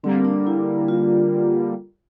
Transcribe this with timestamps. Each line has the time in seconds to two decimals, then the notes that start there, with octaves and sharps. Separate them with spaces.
0.03 D3 G3 A#3 C4
0.25 D4
0.47 E4
0.88 F4